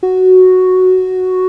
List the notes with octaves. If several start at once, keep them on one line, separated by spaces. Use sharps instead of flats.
F#4